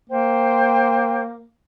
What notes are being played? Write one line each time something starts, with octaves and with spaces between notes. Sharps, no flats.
A#3 C5 G5